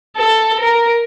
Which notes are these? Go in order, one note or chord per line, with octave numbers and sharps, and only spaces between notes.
A4
A#4